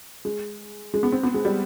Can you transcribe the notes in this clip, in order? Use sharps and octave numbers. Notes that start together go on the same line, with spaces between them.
G#3
G#3
B3
C4
B3
G#3
G3